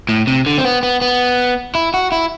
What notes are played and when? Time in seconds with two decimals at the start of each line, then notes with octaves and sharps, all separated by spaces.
0.09 A2
0.27 C3
0.46 D3
0.58 C4
0.65 B3
0.83 B3
1.01 B3
1.75 E4
1.94 F#4
2.12 E4